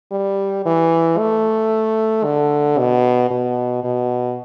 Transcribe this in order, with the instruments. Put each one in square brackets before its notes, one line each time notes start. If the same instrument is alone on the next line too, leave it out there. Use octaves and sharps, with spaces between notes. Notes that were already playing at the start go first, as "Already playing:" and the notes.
[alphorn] G3
E3
A3
D3
B2
B2
B2